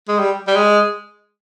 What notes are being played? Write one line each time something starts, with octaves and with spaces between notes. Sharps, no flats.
G#3
G3
G3
G#3